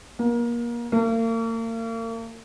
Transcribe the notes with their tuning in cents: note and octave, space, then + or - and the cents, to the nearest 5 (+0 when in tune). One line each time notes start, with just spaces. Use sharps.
A#3 +30
A#3 -40